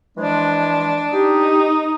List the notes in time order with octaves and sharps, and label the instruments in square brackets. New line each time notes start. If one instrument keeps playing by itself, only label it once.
[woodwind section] E3 F3 G#3 [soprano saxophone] D4
[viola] D#4 [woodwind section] G4